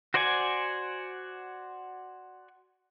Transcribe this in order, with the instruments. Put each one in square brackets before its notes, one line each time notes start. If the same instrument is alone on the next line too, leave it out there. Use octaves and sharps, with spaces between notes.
[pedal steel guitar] F#4 C5 D5 F#5 G#5